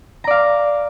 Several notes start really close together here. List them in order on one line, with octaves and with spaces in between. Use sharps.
A#5 D5 F5